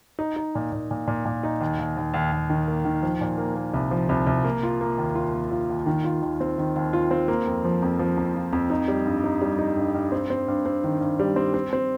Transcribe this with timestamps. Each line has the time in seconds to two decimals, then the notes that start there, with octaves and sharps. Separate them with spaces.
0.19 D#4
0.36 D#4
0.55 A#2
0.72 A#2
0.91 A#2
1.08 A#2
1.25 A#2
1.43 D#4
1.61 D#2
1.79 D#2
1.97 D#2
2.14 D#2
2.32 D#2
2.50 D#3
2.68 A#3
2.85 D#3
3.02 F3
3.21 A#2
3.38 A#3
3.56 A#3
3.74 C2
3.91 F3
4.09 C2
4.27 C2
4.44 A#3
4.63 F4
4.81 A#3
4.98 D#2
5.15 F4
5.33 D#2
5.51 F4
5.70 D#2
5.86 D#3
6.04 F4
6.22 D#2
6.41 C4
6.58 D#3
6.76 D#2
6.93 F4
7.11 C4
7.28 A#3
7.47 F2
7.65 F3
7.82 F2
7.99 F3
8.17 F2
8.34 F4
8.53 F2
8.70 D#4
8.88 G3
9.05 G2
9.24 D#4
9.41 G3
9.59 D#4
9.77 G2
9.94 G2
10.12 C4
10.30 C4
10.48 G2
10.66 C4
10.84 D#3
11.01 G2
11.19 G3
11.36 C4
11.54 C4
11.73 C4